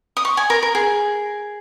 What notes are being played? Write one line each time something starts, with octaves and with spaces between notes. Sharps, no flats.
D#6
C#6
G#5
A#4
A#4
G#4